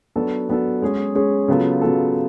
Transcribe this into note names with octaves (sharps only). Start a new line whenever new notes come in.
F#3 B3 D4 F#4 A4
F#3 B3 D4 F#4 A4
G#3 C#4 G#4
G#3 C#4 G#4
C#3 F#3 B3 F4 A4
C#3 F#3 B3 F4 A4